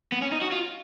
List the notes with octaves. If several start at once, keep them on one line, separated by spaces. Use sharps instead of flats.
B3
C#4
D#4
F#4
F4